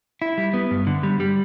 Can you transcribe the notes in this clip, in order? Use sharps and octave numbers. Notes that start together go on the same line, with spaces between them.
E4
G3
B3
G2
D3
G3
G3